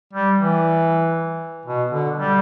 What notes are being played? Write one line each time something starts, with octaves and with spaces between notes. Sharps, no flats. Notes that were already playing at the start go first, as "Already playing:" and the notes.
G3
E3
B2
D3
G3